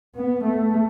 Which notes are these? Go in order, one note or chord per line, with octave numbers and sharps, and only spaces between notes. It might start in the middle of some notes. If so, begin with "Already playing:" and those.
B3
A3